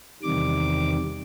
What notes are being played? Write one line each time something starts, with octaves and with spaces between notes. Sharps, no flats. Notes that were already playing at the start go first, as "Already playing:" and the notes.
E2 C3 D#3 G3 D6